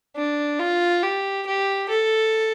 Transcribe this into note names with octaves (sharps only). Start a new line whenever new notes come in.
D4
F4
G4
G4
A4